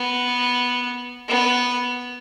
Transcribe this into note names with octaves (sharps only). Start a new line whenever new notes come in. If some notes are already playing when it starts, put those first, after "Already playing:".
Already playing: B3
B3